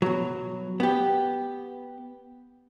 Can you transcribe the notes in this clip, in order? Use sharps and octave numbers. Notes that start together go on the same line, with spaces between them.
B2 F#3
B3 G4